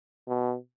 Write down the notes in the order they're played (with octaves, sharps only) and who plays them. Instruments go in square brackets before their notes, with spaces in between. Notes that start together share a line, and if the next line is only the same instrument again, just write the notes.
[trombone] B2